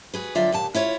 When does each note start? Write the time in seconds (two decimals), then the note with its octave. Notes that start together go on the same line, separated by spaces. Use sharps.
0.14 F#4 G#4 B4
0.35 F2 D3 F#3 F4 D5 E5
0.52 D#2 A#2 A5
0.75 E4 F4 C#5